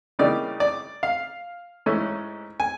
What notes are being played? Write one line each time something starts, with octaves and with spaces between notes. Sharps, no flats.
C#3 E3 G3 A#3 D#4 D5
D5
F5
G#2 E3 A3 C#4
G#5